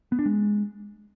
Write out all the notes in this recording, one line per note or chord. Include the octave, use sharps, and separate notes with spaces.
B3
D4
G#3